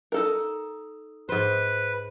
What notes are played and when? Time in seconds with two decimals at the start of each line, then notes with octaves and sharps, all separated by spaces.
0.12 D#4 A4 A#4
1.29 G#2 B4 C5